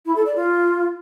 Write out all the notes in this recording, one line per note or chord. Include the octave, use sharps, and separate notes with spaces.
E4
A4
D5
F4